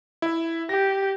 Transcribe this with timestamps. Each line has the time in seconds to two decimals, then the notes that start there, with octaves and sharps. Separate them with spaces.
0.22 E4 E5
0.69 G4 A#6